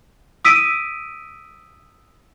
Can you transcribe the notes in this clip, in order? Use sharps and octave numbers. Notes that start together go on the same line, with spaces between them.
D#6 E6 B6 D7 D#7